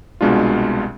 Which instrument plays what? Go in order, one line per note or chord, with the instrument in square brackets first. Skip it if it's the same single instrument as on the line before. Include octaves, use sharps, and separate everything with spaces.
[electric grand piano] C2 B2 G#3 D4 F4